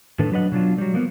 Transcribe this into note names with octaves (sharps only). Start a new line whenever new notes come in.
A2 D#3 D4 A4 B4
F#3 D4 B4 D#5 F#5
B2 F#3 D4 F4
F#3 G3
F3 A#3 B3